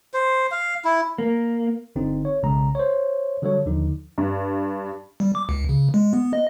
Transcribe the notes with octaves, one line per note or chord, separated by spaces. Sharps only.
C5
F5
E4
A#3
G1 D3 C4 D#4
C#5
B1 C#3 G#3 A#5
C5 C#5
D3 F#3 G3 A4 C#5
D#2 D3 F3 D#4
G2
G3
D6
C#2
C#3
G#3
B3
D#5